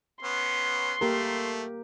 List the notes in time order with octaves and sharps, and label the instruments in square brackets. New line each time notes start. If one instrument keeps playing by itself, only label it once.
[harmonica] B3 C#4 [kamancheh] C6
[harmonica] A3 [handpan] A#3 G4 A#4